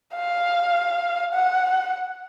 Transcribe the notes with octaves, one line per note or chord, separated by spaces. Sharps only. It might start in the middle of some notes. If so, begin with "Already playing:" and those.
F5
F#5